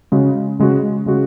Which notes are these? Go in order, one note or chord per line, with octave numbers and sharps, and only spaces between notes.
C#3 G#3 F#4
C#3 G#3 F#4
C#3 G#3 F#4